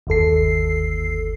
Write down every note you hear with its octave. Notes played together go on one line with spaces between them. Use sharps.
G1 D#2 A4 C7